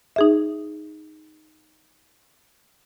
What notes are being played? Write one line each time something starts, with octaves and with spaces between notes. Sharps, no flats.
D#4 G#4 E5